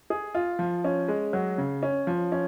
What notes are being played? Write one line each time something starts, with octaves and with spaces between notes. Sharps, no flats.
G#4
F4
F3
C#4
G#3
F#3
C#3
C#4
F3
C#4